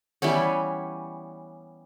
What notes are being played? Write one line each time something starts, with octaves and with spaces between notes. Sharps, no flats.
E3 G3 B3 C#4